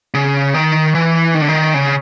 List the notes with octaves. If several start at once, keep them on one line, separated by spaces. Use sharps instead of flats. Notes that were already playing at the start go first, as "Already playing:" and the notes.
C#3
D#3
E3
D#3
D3
D#3
C#3